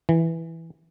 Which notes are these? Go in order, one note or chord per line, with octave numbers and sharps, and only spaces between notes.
E3